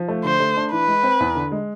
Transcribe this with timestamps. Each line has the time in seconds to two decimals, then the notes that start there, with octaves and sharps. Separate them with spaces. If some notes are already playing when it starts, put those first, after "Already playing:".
Already playing: F3
0.08 A3
0.24 D3 C5
0.40 A3
0.56 D4
0.72 E3 B4
0.88 G#3
1.03 C4
1.20 E2
1.35 D3
1.52 G#3